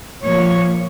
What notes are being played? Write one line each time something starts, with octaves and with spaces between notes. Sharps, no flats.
A#2 F3 A#3 C#5